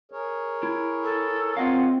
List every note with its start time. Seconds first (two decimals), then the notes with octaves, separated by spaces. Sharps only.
0.12 G#4 A#4 C#5
0.63 E4
1.02 A4
1.57 C4 F4 D#5 F5 F#5